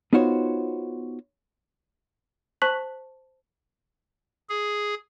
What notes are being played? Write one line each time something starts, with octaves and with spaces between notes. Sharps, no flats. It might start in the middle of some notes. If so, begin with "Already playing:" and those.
B3 D#4 F4 F#4 C5 C#5
C5 A5 C#6 F#6 B6 F#7
G#4